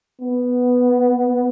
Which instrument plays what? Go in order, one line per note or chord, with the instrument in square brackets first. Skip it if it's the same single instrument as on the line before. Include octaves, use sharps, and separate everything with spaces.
[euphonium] B3